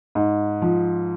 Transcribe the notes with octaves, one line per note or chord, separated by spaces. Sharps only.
G#2
F3